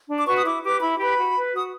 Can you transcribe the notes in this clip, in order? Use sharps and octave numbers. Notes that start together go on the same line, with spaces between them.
D4
D6
F#4 B4 C#6
D#6
E4 D6
G4 B4 D6
E4 B5
G4 B4 B5
F#4
B4
F#4 D#6